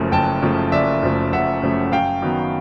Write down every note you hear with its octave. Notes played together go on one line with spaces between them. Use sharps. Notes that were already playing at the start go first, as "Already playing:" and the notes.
Already playing: F#1 F#2 C#3 F3 A3
F#1 G5 A5
F#2 C#3 F3 A3
F#1 D5 E5
F#2 C#3 F3 A3
F#1 E5 F#5
F#2 C#3 F3 A3
F#2 F5 G5
D#3 F#3 B3